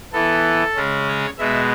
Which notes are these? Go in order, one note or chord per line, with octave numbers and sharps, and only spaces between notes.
E3 B3 A4
C#3 G#3 C#4
C#5
B2 G#3 B3 E5